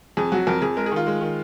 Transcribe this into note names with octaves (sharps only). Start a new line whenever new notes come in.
F2 G#4
F#3 F#4
F2 A#4
F2 G#4
G#3 A#4
G#4
D#3 F4
G#3
D#3